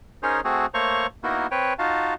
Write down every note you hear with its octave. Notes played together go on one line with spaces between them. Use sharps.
C#4 D#4 G#4 A#4 C5 C#5
A3 C4 F#4 G#4
A3 A#3 C5 C#5 A#5 C#6
A#3 B3 D#4 E4 F#4 A#4
C4 B4 C#5 G5
D#4 F4 F#4 F5 A5